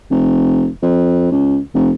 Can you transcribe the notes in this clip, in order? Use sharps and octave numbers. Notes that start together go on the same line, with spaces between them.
F1
F2
C#2
F1